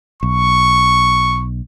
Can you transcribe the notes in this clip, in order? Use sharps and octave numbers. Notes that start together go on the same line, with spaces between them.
B1 C#6